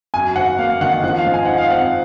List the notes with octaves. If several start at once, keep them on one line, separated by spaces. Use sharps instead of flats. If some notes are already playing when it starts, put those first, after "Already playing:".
F#2 G#5
G#1 F#5
A#3 F5
D#3 F#5
F3 F#5
F5
G#2
G#5
D#4 F#5
F5
C4 F#5